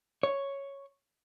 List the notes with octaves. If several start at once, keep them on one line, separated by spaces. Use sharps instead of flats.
C#5